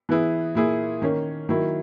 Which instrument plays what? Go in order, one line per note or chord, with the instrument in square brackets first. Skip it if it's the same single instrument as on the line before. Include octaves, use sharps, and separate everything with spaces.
[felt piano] E3 B3 E4 G#4
A#2 A#3 E4 G#4
D#3 A#3 C#4
D#3 F#3 A#3 E4